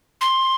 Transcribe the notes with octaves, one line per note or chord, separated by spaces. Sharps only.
C6